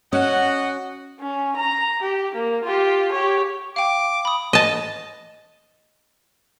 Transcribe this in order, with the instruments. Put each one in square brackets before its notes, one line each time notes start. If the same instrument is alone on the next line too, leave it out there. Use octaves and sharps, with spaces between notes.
[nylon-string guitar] C#4 [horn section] F#4 D#5 F#5
[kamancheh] C#4
A#5
G4
A#3
F4 G4
G4 C#5
[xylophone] F5 G5 [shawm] D6
[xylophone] B5 D#6
[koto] D#5 A5